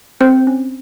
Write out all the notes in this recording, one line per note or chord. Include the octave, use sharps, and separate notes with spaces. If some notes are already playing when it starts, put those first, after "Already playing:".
C4 A4 C5
C#4